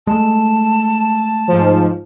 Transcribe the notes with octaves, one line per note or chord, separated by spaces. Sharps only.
G#3 A3 A5
G#2 F3